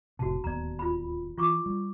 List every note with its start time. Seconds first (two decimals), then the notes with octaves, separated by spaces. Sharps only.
0.19 F1 A2 C3 F#4 A5
0.44 D1 D#2 B3 D5 A#5
0.79 F4 B5
1.37 E3 F4 C#6 D6
1.66 G3